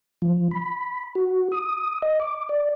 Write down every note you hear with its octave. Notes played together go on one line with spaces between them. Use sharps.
F3
B5
F#4
D#6
D#5
D6
D5